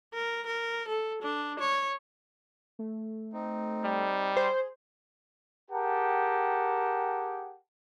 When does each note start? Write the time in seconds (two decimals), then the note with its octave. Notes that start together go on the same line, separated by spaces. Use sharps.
0.14 A#4
0.46 A#4
0.88 A4
1.22 D4
1.60 C#5
2.79 A3
3.33 C4 D#4
3.84 G3
4.37 G#4 C5
5.71 G4 G#4 A#4 F#5 G5 A5